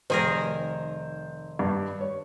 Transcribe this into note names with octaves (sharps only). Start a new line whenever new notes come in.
F1 D#3 G#4 A#4 C5
G2
C#5